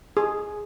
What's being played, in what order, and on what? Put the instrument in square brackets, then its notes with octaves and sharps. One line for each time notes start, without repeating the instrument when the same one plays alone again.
[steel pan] G#4